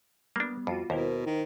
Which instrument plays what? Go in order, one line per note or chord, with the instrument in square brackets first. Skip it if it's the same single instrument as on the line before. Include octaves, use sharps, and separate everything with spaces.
[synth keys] G3 B3 [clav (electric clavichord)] A#3 D4
[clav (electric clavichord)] F2 [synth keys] G3 F4 F#4
[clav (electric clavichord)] D#2 [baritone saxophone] B2 [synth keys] E4 A#4 C5
[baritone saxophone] D#3